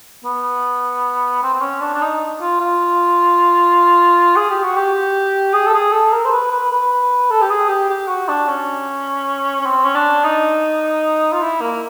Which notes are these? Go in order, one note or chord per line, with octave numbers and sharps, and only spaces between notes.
B3
C4
C4
C#4
D4
D4
D#4
F4
F4
G#4
G4
F#4
G4
G#4
A4
G#4
A4
A#4
C5
B4
B4
B4
A4
G4
G#4
G4
G4
F#4
D4
C#4
C#4
C4
C#4
D4
D#4
F4
E4
A#3